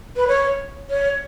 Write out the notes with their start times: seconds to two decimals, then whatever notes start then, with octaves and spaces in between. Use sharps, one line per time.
0.16 B4
0.28 C#5
0.90 C#5